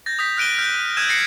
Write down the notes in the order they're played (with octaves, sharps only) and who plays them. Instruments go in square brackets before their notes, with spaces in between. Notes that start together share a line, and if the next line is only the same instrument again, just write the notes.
[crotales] G6 A6 A#6
D#6 G6 B6
F6 F#6 D7 D#7 G7
F6 G6
E6 F6 G6 G#6 D#7 E7
A6 A#6 C7 C#7